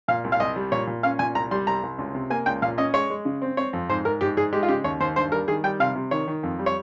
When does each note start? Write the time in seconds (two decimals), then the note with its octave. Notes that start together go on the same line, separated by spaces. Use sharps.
0.08 A#2 F5
0.24 C2
0.32 F5
0.40 C2 D#5
0.56 G3
0.72 A#2 C#5
0.87 A#2
1.03 C#4 F5
1.19 A#2 G#5
1.35 C2 A#5
1.51 G3 C6
1.67 C2 A#5
1.83 C2
1.98 C#2
2.15 C3
2.30 A#3 G#5
2.46 C#2 G5
2.62 A#2 F5
2.78 C#4 D#5
2.94 G#3 C#5
3.10 G#3
3.25 C#3
3.42 C4
3.57 C4 C#5
3.73 F2
3.89 G#2 C5
4.05 G#2 A#4
4.21 G#2 G4
4.37 G#2 G#4
4.53 G#3 G4
4.63 F4
4.69 C#3 G4
4.84 D#2 C#5
5.00 D#2 C5
5.16 G2 C5
5.32 G3 A#4
5.48 D#3 G#4
5.64 G3 G5
5.80 C3 F5
5.95 C3
6.11 D#3 C#5
6.28 D#3
6.43 F2
6.59 G3
6.66 C#5